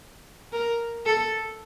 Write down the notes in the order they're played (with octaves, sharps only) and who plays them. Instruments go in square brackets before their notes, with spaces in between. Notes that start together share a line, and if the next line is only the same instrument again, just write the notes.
[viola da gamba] A#4
A4